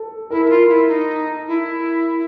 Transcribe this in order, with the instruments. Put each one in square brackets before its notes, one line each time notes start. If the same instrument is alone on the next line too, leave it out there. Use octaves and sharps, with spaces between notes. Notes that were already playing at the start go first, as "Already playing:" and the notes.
Already playing: [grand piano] A4
[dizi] E4 [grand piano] A#4
[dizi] E4
F4
E4
D#4
E4